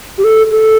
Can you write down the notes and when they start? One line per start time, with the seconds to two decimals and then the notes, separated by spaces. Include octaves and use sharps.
0.18 G4
0.24 A4
0.51 A4